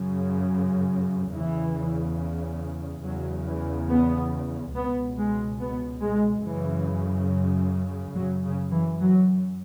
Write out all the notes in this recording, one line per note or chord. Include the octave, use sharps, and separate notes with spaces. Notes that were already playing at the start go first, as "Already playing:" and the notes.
Already playing: F#2 C#3
E2 C#3 E3
E2 C#3 F#3
E3
B3
C#2 B2 B3
G#3
B3
G#3
F#2 C#3 E3
F#2 C#3 F#3
C#3
E3
F#3